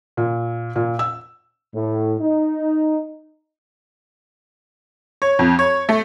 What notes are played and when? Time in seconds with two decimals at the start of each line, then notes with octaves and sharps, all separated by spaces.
0.17 A#2
0.76 A#2
0.99 E6
1.73 A2
2.20 D#4
5.22 C#5
5.39 F2
5.59 C#5
5.89 A3